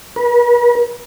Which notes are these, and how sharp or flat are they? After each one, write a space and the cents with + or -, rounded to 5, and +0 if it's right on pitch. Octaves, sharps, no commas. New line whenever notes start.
B4 -45